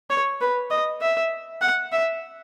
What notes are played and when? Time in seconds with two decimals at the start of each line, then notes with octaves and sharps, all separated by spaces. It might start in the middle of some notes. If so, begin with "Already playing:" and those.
0.10 C#5
0.41 B4
0.70 D#5
1.01 E5
1.61 F#5
1.92 E5